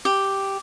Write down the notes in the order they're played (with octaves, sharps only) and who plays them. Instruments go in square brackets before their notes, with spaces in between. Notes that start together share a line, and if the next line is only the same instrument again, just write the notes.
[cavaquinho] G4